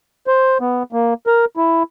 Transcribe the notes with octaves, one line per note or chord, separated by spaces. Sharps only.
C5
B3
A#3
A#4
E4